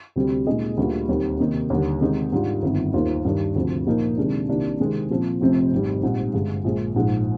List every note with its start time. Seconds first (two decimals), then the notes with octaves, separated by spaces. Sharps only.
0.16 D2 C3 G3 C4 G4
0.47 A#2 G#3 D#4 G#4 D#5
0.77 D2 D3 G3 A#3 F4
1.08 D#2 D#3 G3 C4
1.39 C3 D#3 A#3 D#4
1.70 D#2 D3 G3
2.01 C3 D#3 G#3 D#4
2.32 G#2 G3 D4 F4
2.63 G1 F2 D#3
2.94 D#2 D#3 A#3 F4 C5
3.25 G2 D#3 G3 D4
3.55 D2 C3 F3
3.86 A#2 F3 A#3 D#4 A#4
4.17 C3 D#3 G#3 D4
4.48 C2 C3 D#3 A#3 D4
4.79 C3 D#3 G#3 C4
5.10 A#2 F3 C4
5.41 F1 F2 C3 F3 C4
5.72 G#1 G#2 G3
6.02 A#1 G#2 G3 C4 D#4
6.33 G2 D3 G#3
6.64 A#1 A#2 G#3
6.96 A#1 G#2 F3 G#3